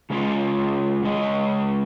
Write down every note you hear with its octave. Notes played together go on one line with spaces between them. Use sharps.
C#3 G#3 C#4 F4
C#3 G#3 C#4 G#4 D#5